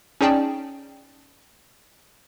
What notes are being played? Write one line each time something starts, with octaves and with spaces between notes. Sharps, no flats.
C#4 D#4 G#4 D5 G5 A5